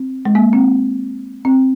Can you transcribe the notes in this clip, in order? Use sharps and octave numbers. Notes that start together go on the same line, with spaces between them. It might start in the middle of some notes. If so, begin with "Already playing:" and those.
Already playing: C4
G#3
A#3
C4
C4